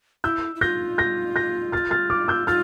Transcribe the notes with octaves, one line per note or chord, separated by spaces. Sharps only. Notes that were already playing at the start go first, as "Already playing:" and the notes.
E4 E6 G6
E4
F4 G6 A#6
G6 A#6
G6 A#6
F6 A6
F6 A6
D6 F6
E6 G6
F4 F6 A6